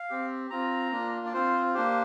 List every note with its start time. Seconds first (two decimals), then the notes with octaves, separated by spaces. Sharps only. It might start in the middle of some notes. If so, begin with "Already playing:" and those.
Already playing: F5
0.10 C4 G4
0.50 C4 F4 A#5
0.91 A#3 D4 F4
1.26 D5
1.33 C4 F4 C5
1.74 A#3 D4 G4 C5